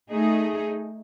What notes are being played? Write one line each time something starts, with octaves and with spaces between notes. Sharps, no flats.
A3 D#4 G#4